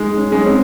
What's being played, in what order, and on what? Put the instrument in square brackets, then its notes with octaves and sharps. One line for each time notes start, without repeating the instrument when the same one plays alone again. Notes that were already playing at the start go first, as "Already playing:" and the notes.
Already playing: [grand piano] G#3 [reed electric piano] D#4
[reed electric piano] C#4
[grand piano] G#3
[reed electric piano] C#4
C4